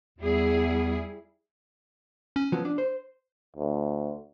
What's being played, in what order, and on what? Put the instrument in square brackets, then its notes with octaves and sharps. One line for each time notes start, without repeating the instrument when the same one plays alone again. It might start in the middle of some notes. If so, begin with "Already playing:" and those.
[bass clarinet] E2 [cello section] G3 E4 G#4
[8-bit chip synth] C#4
[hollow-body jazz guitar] F3 F#3 B3
D4
C5
[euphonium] D2